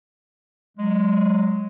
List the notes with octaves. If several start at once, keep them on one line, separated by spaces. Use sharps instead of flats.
F#3 G#3